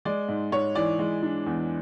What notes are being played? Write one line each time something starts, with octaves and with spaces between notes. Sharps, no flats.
G#3 D5
G#2
G#2 C#5
E3 D5
G#3
D4
E2